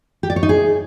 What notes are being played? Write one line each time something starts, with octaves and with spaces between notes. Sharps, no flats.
G4
D5
C#5
D#4
G#4